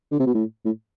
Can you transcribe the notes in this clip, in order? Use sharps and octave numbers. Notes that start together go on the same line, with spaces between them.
D3
C3
B2
A2
A2